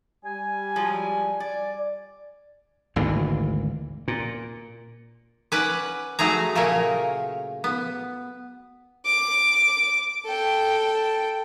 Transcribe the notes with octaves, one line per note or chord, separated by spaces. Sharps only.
G3 G#5
F3 F#3 G#3
D5
G#1 D2 A#2 E3
A#2
C#4 B4 D5 F#5
F#3 A3 G#4 A#5
A#2 C#3 A3 A#4 C#5
B3
D6
A4 G5